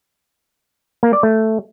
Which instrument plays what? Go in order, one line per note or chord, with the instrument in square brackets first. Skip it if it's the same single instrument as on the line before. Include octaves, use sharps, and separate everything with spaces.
[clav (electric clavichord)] A#3
D5
A3